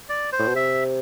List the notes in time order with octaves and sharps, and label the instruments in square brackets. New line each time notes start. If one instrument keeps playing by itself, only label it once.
[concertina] D5
C5
[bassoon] A2
B2
[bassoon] C3 [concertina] E5